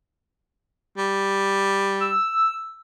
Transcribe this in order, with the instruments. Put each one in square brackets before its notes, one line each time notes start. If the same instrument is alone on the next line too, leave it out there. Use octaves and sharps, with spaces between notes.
[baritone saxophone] G3
[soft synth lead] E6